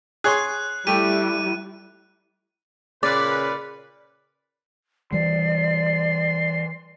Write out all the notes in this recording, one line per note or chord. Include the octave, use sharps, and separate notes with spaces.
G#4 C#5 C6 F#6
G3 A3 E4 G4 D#7
A#2 C#3 B4 D5
E3 G3 D5 C6